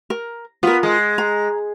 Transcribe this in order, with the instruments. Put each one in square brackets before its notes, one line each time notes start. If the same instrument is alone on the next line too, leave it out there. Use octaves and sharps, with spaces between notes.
[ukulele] A#4
[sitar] B3 [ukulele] F4 A#4
[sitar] G#3
[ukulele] A#5